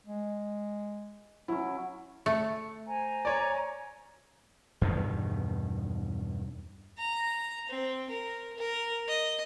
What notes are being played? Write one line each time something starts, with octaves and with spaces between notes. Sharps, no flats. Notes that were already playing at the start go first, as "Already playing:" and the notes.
G#3
F#3 C#4 E4
A3 C#7
C5 G#5 A#5
C#5 D5
E2 G2 B2 D#3
A#5
C4
A#4
A#4
D#5